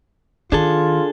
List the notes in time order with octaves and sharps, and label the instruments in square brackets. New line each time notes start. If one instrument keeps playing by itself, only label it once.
[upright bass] D#3 [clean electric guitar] D4 G#4 A4 [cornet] F4